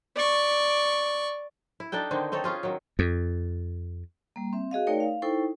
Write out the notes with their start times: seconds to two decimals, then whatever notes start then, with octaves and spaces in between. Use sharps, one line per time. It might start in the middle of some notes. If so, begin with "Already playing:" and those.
0.16 D5 C#6
1.80 E4
1.92 D4 D#4 A4 G5
2.11 D3 D#3 C4 D#4
2.32 C4 D#4 A4 C#5
2.44 C#4 F4 G#4
2.63 D#3 F#3
2.99 F2
4.36 G3 A#3
4.53 C4 E5
4.71 F#4 G#4 D#5 F5
4.87 A3 D#4 A#4 C#5 D5 G5
5.00 F5
5.22 D#4 E4 A4 C5 G5 C#6